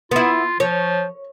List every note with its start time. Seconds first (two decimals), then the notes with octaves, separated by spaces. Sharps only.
0.11 B3 E4 F4
0.60 F3 C#5